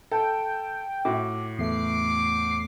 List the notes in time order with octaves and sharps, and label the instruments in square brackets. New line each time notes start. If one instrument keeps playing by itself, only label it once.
[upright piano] A4 [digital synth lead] G5
[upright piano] A2 F#4 [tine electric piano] D6
[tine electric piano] E2 A3 [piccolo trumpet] D6 [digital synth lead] C7